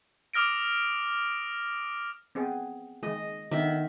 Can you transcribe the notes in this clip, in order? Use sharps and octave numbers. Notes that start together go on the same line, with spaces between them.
D6 D#6 F6 A#6 D7
B3 C4 G#4
D#3 G#3 D#5
D3 D#3 B3 E5